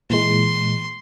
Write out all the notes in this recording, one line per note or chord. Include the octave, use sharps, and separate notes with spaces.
A#2 E3 G#3 C6